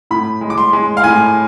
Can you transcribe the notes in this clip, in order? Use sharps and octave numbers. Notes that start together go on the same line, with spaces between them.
A2 B5
G#3
D6
C6
G#3
F5
A2 G#5